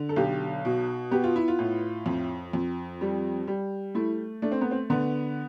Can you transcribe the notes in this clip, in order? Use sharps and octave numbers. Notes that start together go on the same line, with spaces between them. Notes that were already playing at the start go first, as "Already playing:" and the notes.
Already playing: D3
A4
B1 G4
B2
B3 G4
F4
E4
F4
A2
F2
F2
G3
G3
A3 E4
A3 D4
C4
B3
C4
D3 B3